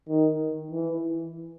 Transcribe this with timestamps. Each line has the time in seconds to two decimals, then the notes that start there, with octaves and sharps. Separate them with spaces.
0.09 D#3
0.71 E3